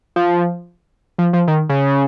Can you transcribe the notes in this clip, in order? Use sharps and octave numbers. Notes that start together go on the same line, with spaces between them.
F3
F3
F3
D#3
C#3